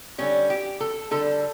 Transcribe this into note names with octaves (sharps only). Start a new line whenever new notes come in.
D3 G3 C#4
G4
A4
D3 G3 A4